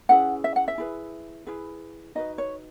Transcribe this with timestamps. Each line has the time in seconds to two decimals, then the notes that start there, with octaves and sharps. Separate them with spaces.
0.09 C#4 E4 G#4 B4 F#5
0.44 E5
0.56 F#5
0.68 E5
0.78 E4 G#4 B4
1.47 E4 G#4 B4
2.15 D#4 F#4 B4 D#5
2.38 C#5